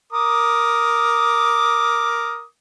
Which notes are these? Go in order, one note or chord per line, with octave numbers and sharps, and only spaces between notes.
A#4 D6 D#6